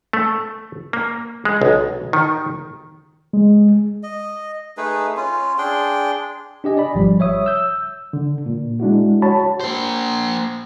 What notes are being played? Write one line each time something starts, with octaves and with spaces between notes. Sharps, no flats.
A3
A#3
G#3
B1
D#3
G#3
D#5
A3 D#4 G#4 B4
C#4 F4
D4 G#4 G5 C6
D4 G4 D#5 G#5
D5 B5
G#1 F3 G3
C#5 E5 D#6
E6 G6
D3
A#2
G#3 D4 E4 F#4
F#4 C#5 A5 B5
A#3 C5